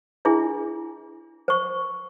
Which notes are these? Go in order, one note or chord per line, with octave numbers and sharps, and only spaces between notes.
D4 E4 F4 G#4
C5 C#6